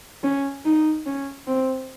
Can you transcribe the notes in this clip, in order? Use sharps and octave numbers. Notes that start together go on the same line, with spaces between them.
C#4
D#4
C#4
C4